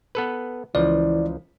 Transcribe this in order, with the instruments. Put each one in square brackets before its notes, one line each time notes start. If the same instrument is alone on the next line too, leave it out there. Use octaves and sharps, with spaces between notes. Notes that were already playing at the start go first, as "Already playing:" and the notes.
[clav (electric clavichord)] B3 A4 B4
[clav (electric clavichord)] C#2 F3 [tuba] E3 [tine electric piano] D5